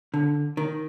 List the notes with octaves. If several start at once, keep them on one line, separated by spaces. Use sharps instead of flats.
D3
D#3